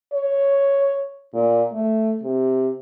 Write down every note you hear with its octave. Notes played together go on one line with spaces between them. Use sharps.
C#5
A#2
A3
C3